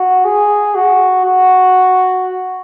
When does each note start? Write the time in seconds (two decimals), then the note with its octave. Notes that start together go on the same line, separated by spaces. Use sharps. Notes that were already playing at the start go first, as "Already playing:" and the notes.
Already playing: F#4
0.24 G#4
0.75 F#4
1.25 F#4